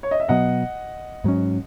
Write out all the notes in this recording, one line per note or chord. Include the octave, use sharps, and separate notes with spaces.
C#5
D#5
E5
B2 F#3 B3 D#5 F#5
G#2 F#3 C#4